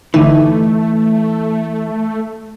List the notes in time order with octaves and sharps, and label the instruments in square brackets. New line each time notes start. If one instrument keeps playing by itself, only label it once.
[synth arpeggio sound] G1 D3 D#4 [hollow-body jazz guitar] E3 [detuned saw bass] A3